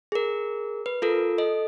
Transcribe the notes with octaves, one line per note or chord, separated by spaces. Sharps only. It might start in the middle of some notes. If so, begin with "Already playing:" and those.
G#4 A#4
B4
F4 A4 A#4
A4 D#5